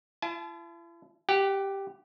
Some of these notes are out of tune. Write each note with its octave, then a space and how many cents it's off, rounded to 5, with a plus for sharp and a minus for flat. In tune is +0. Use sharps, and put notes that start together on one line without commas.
E4 +45 A5 -35
G4 +0 F#5 +35